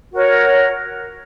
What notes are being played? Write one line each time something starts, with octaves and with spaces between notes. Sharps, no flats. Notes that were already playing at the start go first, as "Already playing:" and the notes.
F#4 A#4 C#5